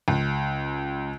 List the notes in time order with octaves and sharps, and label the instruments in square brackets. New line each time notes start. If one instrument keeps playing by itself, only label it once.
[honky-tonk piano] C#2